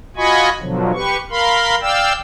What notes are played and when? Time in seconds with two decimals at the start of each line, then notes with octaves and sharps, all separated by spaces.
0.17 F4 F#4 D#5 G#5 B5 C#6
0.61 B2 D3 F3 F#3
0.94 G4 B4 C#6
1.30 A#4 F5 B5 C6
1.81 D5 F5 G5 E6